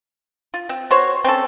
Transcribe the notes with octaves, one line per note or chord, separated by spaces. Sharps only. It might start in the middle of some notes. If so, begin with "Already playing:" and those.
F4
C4
F#4 C5 C#5
C4 C#4 A4